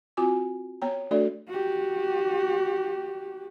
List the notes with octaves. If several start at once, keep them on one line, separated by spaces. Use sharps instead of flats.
C4 F4 F#4 G#5 D6
B3 C#5 G5 A#5
A3 D4 F#4 A4 D5 E5
F#4 G4